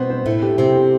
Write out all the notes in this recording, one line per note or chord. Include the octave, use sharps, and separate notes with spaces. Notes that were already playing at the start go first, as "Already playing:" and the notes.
Already playing: B2 B3 C4 C5
C5
A2 A3 E4
G4
C3 C4 G4
G4